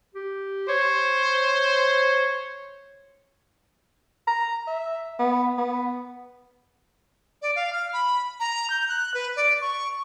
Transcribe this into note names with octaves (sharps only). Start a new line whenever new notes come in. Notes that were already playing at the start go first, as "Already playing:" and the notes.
G4
C5 C#5
A#5
E5
B3
B3
D5
F5
F6
B5
A#5
G6
F#6
B4
D5
C#6